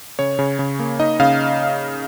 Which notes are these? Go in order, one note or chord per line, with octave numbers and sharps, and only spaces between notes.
C#3 C#5
C#3
C#3
A#3
D#4 D#5
C#3 F5